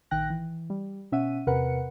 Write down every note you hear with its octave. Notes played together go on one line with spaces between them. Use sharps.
A#1 D#3 G5 F#6 A#6
E3
G3
B2 C#4 E5 F#5 D#7
E2 C3 A#4 B4 F#5 C#7